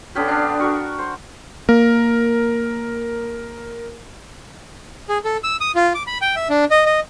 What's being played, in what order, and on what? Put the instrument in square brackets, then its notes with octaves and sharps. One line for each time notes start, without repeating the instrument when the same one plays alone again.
[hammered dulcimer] D3 B3 C#4 G4
D4 F5
F#4 A#4 C#6
C5
[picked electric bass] A#3 [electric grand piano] A#4
[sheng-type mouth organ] G#4
A4
E6
D#6
F4
D6
B5
G5
E5
D4
D#5
D#5